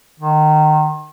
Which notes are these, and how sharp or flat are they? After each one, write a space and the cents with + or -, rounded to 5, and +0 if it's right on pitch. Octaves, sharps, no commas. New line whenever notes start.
D#3 -25